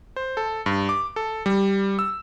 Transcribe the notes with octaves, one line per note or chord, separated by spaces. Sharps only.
C5
A4
G2
D6
A4
G3
E6